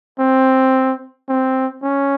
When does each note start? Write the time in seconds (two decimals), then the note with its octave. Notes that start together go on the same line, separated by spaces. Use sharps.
0.19 C4
1.29 C4
1.83 C#4